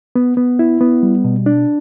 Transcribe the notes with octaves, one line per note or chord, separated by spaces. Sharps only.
B3
B3
E4
B3
G3
B2
D4